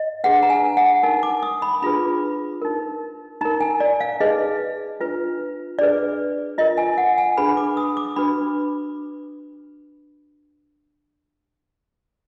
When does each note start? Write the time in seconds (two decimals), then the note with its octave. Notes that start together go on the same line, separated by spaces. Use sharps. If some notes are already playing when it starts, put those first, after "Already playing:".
Already playing: D#5
0.24 D4 G#4 B4 F#5
0.43 A#5
0.50 G#5
0.77 F#5
1.03 D#4 A#4 G#5
1.23 D6
1.43 D#6
1.62 B5
1.82 D4 F4 G#4 B4 B5
2.62 D#4 A#4
3.41 D#4 A#4 A#5
3.61 G#5
3.80 D5
4.00 F5
4.20 D#4 G#4 B4 D#5
5.00 D4 F4 B4
5.78 D4 G#4 B4 D5
6.58 F4 A#4 D#5
6.78 G#5
6.98 F#5
7.18 G#5
7.37 D4 G#4 B4 B5
7.57 D6
7.77 D#6
7.97 D6
8.16 D4 F#4 B4 B5